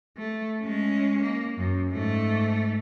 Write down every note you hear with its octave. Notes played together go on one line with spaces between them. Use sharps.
A3
G#3 C#4
A#3
F#2
G#2 A3